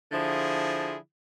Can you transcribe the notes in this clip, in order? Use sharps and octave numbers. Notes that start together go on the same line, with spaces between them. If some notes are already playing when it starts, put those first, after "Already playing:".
D3 F3 E4 F4 G#4